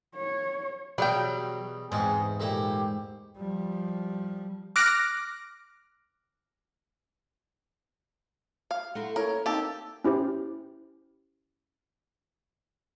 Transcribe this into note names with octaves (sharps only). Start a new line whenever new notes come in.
C#5
E2 B2 F#3 G3 G5 C6
E2 G#2 C4 D#4 G#4
A#2 A3 E4 G4
F3 G3
D6 F6 F#6 A#6 D7
F5
A3 E4 F#5 A#5 C6
A#3 C#4 E4 A#4 C#5
A#3 C4 D#4 G4 A5 E6
C#4 E4 G4 C5